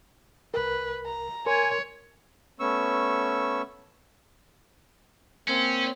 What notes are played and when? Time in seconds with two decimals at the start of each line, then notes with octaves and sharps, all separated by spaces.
0.54 C2 A#4 B4
1.06 A#5
1.46 A#4 C#5 G#5 C6
2.60 A3 B3 C#4 C#6 E6
5.48 A#3 C4 C#4